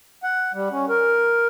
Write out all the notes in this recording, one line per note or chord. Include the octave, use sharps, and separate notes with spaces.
F#5
G3
C#4
A#4